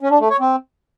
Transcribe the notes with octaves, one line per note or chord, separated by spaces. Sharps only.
C#4
D4
A3
C#5
C4